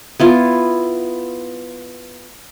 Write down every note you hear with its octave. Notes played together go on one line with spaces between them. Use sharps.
B3 E4 F4